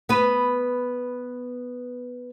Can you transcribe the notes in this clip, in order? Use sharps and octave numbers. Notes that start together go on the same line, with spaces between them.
B3 B4